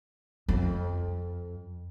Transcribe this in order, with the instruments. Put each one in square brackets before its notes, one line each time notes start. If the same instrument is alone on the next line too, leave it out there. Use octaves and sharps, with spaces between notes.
[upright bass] F2